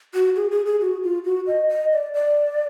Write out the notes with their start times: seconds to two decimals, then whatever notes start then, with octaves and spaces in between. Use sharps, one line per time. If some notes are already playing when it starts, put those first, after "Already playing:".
0.14 F#4
0.36 G#4
0.51 G#4
0.66 G#4
0.81 F#4
1.03 F4
1.25 F#4
1.47 D#5
1.69 D#5
1.92 D5
2.14 D5